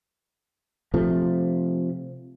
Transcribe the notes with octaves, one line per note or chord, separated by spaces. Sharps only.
C3 F3 A3